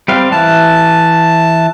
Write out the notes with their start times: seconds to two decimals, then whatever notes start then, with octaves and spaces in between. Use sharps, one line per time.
0.08 G3 C4 F5
0.32 E3 A5